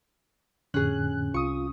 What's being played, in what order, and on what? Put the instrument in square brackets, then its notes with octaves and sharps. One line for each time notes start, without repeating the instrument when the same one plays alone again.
[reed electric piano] F2 A2 D3 [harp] C#4 G#4 [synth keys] F#6
[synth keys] C2 D#6 [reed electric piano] F4 [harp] C#6